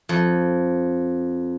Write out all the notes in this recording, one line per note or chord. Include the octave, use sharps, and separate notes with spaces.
F2